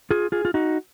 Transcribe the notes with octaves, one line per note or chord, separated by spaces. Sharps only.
F4 G#4
F4 G#4
F4
D#4 F#4